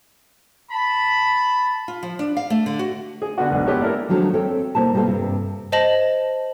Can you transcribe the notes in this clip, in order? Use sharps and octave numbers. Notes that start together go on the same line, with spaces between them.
A5 B5
F4
F3
D4
F5
A3
D3
F#4
G#4
D3 B3 F#4
B1 G#2 D3 B3
F#3 G#3 B3 G4 A4 C#5
A#3 C#4 D4 E4 A4 A#4
D#3 F3 F#3 A3 D4
C4 A4 C#5 E5 G5
C3 G3 A#3 E4 A5
B2 G3 A#3 F4 A4 F5
G2 C3
C5 D#5 A5 A#6 F#7